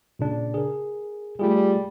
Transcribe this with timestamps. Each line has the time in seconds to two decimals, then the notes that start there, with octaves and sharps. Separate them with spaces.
0.19 A#2 C#3 D4
0.54 G#4 A#4
1.39 G3 A3 F4 G#4